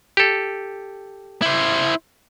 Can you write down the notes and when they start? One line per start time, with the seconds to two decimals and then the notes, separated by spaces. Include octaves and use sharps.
0.17 G4 A4
1.42 E4 C5